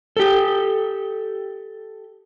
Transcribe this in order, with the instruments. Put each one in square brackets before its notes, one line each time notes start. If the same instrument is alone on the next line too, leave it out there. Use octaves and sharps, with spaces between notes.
[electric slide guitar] G4 A4